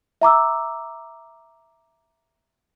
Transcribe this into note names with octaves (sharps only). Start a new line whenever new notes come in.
E5 A#5 D6 E6